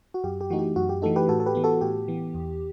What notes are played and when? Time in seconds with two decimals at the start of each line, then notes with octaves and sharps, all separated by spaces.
0.14 F#4
0.24 F#2 G4
0.41 G4
0.50 E3 A3 D#4 F#4
0.59 G4
0.76 F#2 F#4
0.89 G4
1.02 E3 A3 D#4 F#4 A4
1.16 G4 B4
1.29 A2 F#4 A4
1.40 A4
1.46 G4 B4
1.55 E3 B3
1.64 F#4 A4
1.81 A2 G4
2.08 E3 B3
2.35 E2